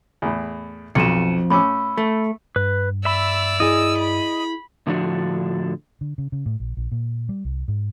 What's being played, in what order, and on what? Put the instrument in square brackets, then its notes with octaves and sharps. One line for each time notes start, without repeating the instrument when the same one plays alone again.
[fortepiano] E2 A2
[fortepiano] B1 B2 [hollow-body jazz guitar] F2 [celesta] C#7 D#7 E7
[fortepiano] A2 C#4 D6 [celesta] B5 E6
[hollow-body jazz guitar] A3
[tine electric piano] G2 [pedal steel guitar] B4
[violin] D5 E6 [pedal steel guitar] E5 B5
[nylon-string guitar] E4 G#4 G#5 [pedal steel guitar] D#5
[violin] B5
[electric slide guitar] A2 D3 F3 D4 F#4
[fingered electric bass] D3
C#3
C#3
A2
A#1
A#1
A#2
G3
C2
G#2